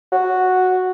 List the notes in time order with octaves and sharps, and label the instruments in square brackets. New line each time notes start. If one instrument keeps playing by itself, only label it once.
[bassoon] F#4